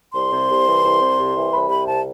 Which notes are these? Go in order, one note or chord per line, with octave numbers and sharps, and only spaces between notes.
C2 C6
C3
C2
E3
C2
C3
C2
E3
C2 B5
C3 B5
C2 A5